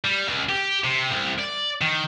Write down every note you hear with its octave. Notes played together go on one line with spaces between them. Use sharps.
G3
C#2
G4
C3
C2
D5
D#3